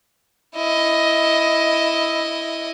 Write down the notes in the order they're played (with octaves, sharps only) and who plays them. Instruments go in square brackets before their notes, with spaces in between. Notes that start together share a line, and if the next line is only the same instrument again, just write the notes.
[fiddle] E4 D#5